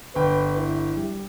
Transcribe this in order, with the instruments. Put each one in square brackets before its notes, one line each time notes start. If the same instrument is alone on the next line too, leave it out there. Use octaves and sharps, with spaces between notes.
[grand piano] G1 G5 [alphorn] B4
[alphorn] E4
[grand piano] G3